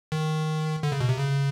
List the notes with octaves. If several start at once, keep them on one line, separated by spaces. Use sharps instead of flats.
D#3
D3
C#3
B2
C3
C#3